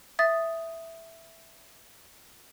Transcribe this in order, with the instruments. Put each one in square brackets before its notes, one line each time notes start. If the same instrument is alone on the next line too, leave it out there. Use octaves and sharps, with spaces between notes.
[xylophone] E5 D#6 A6